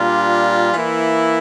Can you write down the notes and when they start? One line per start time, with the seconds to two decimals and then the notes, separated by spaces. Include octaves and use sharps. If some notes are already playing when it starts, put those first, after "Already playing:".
Already playing: A#2 G3 D4 F4
0.73 E3 A#3 E4